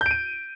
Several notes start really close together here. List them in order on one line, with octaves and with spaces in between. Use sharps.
G6 D7 D#7